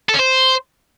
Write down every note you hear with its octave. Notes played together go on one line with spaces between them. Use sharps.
A4
C#4
C5